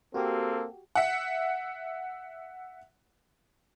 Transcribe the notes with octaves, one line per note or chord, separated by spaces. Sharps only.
A#3 C4 F#4 G4 A4
E5 F#5